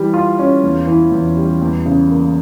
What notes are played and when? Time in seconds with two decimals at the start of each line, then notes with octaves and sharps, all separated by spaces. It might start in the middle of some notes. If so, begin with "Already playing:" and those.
Already playing: E3 G3
0.14 F4
0.39 C#4
0.63 E2
0.87 E3
1.12 E2
1.37 G3
1.62 E2
1.86 C#3
2.10 A#3